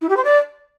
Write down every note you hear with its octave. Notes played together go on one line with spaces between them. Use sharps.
E4
G4
C5
D5